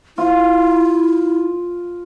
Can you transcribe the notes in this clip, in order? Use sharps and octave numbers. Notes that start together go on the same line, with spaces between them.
E4 F4